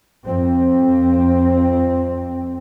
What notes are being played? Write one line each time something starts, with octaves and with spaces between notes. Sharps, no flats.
F2 C4